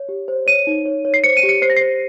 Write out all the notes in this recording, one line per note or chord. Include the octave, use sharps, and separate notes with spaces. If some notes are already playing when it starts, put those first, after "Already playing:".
Already playing: C#5
G4
C5
C#5 D#7
D#4
C#5
C#5
C7
C5 C#7
D#7
G4
C#7
C5 C7
A#6
C5 C7